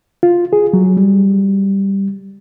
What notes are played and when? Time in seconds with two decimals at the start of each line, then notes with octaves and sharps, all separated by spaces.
0.23 F4
0.53 G#4
0.73 F#3
0.97 G3